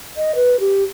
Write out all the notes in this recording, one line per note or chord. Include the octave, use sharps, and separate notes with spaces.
D#5
B4
G4